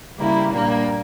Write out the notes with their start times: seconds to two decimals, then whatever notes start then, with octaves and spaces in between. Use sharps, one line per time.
0.18 C#3 G3 A#3 E4
0.52 A#2 G3 A#3 D4